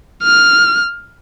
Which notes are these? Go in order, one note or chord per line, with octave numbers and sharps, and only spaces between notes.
F6